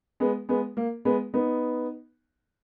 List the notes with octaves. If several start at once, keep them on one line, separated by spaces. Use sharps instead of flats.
G#3 B3
G#3 B3
A#3
G#3 B3
B3 D#4